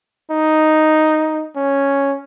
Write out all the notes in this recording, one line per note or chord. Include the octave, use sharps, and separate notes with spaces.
D#4
C#4